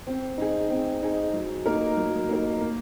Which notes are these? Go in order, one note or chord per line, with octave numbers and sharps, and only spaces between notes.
C4
D#4 G#4
C4
D#4 G#4
F#3
A#3 D#4 A#4
F#3
A#3 D#4 A#4
A#3